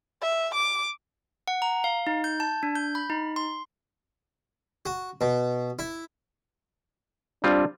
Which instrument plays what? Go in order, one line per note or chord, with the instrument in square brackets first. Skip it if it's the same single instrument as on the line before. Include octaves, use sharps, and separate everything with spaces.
[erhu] E5
D6
[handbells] F#5
A#5
F5
D#4
G6
A5
D4
G6
B5
D#4
C6
[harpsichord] F#4
B2
E4
[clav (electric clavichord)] G3 C4 F4 [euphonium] D4